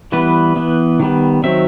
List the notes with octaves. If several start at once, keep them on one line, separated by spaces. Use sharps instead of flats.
E3 G3 B3 B4
E3 B3
D#3 G3 B3
D#3 F#3 C4 E5